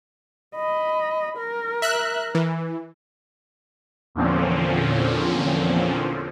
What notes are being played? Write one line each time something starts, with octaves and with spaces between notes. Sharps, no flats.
D#5 B5
A#4
E5 F#6
E3
E2 A#2 D3 F3 C4 C#4